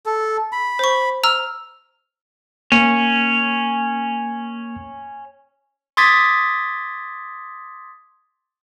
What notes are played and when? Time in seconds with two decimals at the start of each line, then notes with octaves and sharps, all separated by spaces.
0.06 A4
0.52 B5
0.79 C5 C#6
1.23 A#5 E6 F6
2.72 A#3 C#4
5.97 C6 D6 D#6 G#6 A6 B6